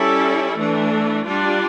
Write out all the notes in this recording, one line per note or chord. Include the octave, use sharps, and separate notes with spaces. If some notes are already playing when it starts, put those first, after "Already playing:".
Already playing: G3 C#4 E4 A4
E3 A3 D4
G3 D4 F4